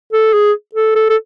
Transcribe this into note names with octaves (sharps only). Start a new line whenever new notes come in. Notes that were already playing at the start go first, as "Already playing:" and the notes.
A4
G#4
A4
A4
A4